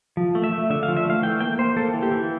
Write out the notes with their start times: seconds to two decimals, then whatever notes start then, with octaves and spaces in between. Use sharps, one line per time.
0.17 F3
0.35 A3
0.44 E5
0.53 A3
0.70 D3 E5
0.83 F5
0.88 F3
0.97 E5
1.05 A3 F5
1.23 E3 G5
1.41 A#3 G5
1.59 A#3 C5
1.76 A#3 A4
1.93 E3
2.03 G4
2.12 E3